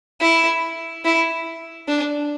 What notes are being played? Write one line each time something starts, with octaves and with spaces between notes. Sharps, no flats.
E4
E4
D4